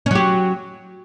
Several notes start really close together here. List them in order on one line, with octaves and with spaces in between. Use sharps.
C#4 F#3 G4